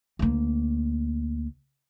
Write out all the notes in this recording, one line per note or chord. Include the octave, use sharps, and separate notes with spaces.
D2 A#3